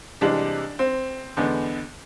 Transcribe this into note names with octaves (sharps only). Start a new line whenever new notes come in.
C2 C3 E3 G#3 D4
C4
E2 D3 G#3 B3